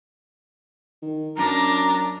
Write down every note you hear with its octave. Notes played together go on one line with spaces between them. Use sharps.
D#3
F#2 D4 A#5